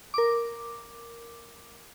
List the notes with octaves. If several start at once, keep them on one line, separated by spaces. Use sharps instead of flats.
A#4 D6